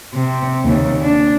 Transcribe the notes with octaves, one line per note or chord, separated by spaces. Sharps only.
C3
D#2 C#3
D4